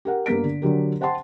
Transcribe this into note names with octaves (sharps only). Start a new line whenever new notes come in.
G4 A#4 F#5
G2 A#3 B3 B6 D7
D3
D3 F#3 G4 A#4
C5 F#5 G5 A5 C6